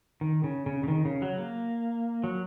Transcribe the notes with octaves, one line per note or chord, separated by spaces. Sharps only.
D#3
C#3
C#3
C#3
D#3
C#3
F#3
A#3
F#3